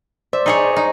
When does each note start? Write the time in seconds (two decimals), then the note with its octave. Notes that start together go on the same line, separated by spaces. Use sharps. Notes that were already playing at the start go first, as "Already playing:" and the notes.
0.33 C5 D5 E5
0.46 D#4 G#4 C#5
0.76 D#4